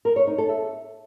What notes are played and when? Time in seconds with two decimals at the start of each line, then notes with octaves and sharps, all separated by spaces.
0.05 A#4
0.16 C#5
0.27 D#4
0.38 A4
0.49 E5